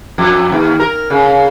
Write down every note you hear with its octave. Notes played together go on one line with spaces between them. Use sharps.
F2
D#2
A#4
C#3